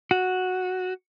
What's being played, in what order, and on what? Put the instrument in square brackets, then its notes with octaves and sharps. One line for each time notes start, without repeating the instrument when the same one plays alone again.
[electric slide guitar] F#4